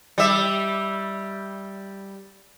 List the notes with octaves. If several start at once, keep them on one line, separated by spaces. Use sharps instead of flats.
G3 E5